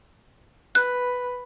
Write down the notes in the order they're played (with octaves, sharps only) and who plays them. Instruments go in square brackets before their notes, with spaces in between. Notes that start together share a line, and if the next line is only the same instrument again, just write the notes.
[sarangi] B4 [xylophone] F#6